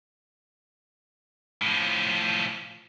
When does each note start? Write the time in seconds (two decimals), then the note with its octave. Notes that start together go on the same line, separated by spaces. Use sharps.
1.62 A2 F3